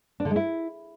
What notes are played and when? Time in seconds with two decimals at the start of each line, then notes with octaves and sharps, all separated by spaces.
0.20 D4
0.25 D3
0.30 G#3
0.36 E4